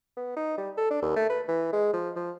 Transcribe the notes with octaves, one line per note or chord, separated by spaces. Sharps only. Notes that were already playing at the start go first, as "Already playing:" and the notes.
B3
D#4
G3
A4
D4
D#2
A3
B4
E3
G#3
F3
F3